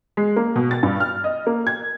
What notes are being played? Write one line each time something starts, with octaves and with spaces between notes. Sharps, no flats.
G#3
A#3
B2
A6
G2
F6
D#5
A#3
G#6